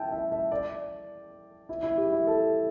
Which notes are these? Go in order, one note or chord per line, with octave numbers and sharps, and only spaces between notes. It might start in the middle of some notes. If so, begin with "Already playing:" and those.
Already playing: E4 G5 A5
E5
E5
D5
E4
E4
G4
E4
A4